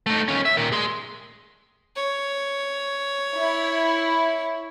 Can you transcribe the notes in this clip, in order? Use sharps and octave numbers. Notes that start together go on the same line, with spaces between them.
A3 D#4
D#2 C#4
E5
A#2 D#3
G#4 C6
C#5
E4